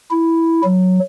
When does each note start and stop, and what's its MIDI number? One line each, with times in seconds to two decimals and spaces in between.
0.11 0.62 64
0.64 1.00 54